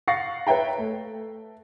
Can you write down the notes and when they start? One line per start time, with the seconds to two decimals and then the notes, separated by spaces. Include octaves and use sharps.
0.08 F5 F#5 C#6 A6 A#6 C7
0.47 B4 C#5 E5 G5 A#5
0.78 A3